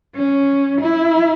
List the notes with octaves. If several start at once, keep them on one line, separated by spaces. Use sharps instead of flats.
C#4
E4